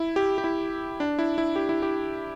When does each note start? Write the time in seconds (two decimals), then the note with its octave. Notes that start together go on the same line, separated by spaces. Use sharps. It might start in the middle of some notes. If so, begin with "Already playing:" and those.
Already playing: E4
0.16 G4
0.38 G4
0.44 E4
1.00 D4
1.19 E4
1.38 E4
1.56 G4
1.69 E4
1.82 G4